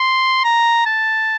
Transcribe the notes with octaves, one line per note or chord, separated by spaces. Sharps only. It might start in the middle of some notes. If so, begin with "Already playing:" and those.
Already playing: C6
A#5
A5